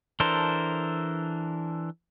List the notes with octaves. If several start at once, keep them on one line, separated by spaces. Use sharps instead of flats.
E3 D4 A4 A#4 C5